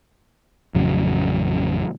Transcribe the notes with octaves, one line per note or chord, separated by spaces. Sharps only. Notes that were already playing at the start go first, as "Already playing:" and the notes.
A1 F2 C#3 F#3